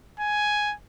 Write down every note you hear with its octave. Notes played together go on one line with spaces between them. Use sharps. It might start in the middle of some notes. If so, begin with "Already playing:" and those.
G#5